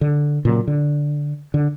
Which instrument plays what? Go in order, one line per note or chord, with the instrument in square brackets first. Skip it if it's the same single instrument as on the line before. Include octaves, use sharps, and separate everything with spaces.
[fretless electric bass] D3
A#2 C#3 F#3
D3
D3